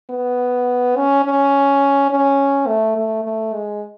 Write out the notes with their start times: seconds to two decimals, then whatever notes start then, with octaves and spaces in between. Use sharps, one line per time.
0.10 B3
0.96 C#4
1.25 C#4
2.10 C#4
2.67 A3
2.97 A3
3.24 A3
3.53 G#3